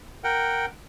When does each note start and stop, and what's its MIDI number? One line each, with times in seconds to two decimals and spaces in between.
0.24 0.66 70
0.24 0.66 78
0.24 0.66 79